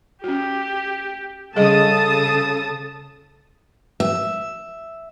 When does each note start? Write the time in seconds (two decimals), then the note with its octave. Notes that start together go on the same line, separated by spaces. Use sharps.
0.24 C#4 F#4 G4
1.56 C#3 G3 G#4 A4 D#5 A5 D#6
4.00 E5